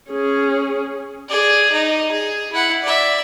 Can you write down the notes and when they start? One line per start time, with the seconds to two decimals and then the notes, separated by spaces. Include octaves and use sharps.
0.11 C#4 G#4
1.28 G#4 D5
1.73 D#4
2.12 G#4
2.53 E4 F#5
2.83 D5 E5